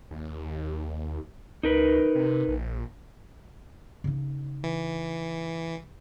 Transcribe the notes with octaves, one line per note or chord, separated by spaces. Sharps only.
D#2
C#2 D#4 A#4 B4
C3
A#1
C#3 D#4
E3